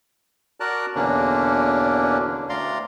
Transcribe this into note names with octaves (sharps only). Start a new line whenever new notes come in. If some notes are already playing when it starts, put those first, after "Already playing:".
F#4 A#4 D5 A5 A#5 F#6
E2 B2 D3 A#3 C#4 D4
D2 D5 F5 A#5 C6